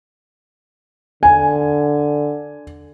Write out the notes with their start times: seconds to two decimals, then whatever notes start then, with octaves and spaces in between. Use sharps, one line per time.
1.23 D3 G#5